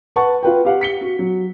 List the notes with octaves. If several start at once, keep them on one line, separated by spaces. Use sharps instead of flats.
B4 F#5 A5 C#6
F4 B4 G5
G4 F5 F#5
B6 C#7 G7
F#4
F#3